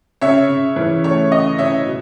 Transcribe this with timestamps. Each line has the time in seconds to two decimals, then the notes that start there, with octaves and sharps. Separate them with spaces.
0.21 C#3 C#5 E5
0.49 C#3
0.76 E3
1.04 A3 C#5
1.31 C#3 D#5
1.58 C#3 C#5 E5
1.86 B2